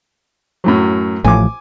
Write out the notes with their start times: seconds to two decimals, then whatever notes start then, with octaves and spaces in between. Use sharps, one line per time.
0.64 F#2 A2 F#3
1.24 A1 A2 F3 G#5 D6